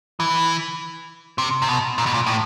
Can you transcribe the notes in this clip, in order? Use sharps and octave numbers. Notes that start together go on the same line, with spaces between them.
E3
C3
C3
B2
A#2
B2
A#2
A2